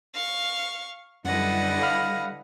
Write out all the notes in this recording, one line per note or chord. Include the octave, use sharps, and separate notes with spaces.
F5 C#6
F#2 D3 G3 E4 B4 D#5 F#5
F5 B5 F6